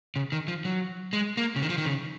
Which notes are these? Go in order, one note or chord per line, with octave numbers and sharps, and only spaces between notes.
C#3
D#3
F3
F#3
G#3
A#3
C#3
D#3
F3
D#3
C#3